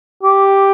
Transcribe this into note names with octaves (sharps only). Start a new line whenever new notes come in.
G4